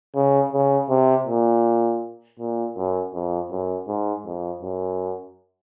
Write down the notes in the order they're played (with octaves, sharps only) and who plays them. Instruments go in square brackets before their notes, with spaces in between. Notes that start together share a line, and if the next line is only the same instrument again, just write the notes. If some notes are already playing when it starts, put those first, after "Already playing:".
[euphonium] C#3
C#3
C3
A#2
A#2
F#2
F2
F#2
G#2
F2
F#2